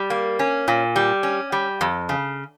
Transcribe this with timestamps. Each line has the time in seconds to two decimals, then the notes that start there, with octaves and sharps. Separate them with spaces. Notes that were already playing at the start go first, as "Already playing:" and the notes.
Already playing: G3
0.10 A#3
0.39 C#4
0.68 A#2
0.96 G3
1.23 C#4
1.52 G3
1.81 F2
2.09 C#3